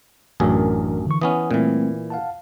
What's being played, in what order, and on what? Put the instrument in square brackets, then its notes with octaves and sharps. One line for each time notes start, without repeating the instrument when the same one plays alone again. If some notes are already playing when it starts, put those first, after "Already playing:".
[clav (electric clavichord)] A1 F#2 G#4 [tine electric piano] E3 D4 A#4
[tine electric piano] D3 E3 C#6
[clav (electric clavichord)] E3 B3 C#4 [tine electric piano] D#6
[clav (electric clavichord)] A#2 E3 [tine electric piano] G3 A3 C4
[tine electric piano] F5 F#5 A5